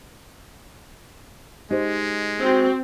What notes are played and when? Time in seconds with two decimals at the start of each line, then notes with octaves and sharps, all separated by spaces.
1.71 G#3 D#4 G4 C5
2.40 C4 F#4